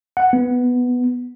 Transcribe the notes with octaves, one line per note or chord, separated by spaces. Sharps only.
F#5
B3